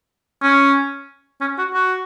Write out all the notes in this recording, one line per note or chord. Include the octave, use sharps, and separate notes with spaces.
C#4
C#4
F#4
F#4